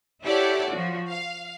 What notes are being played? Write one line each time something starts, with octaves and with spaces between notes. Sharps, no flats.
E4 G4 A4 C#5 D5 F#5
F3 F#4
F5